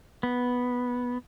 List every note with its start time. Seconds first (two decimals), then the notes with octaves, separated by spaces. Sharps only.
0.23 B3